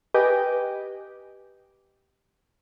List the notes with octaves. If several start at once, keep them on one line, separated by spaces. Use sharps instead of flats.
G4 B4 D#5 G5 G#5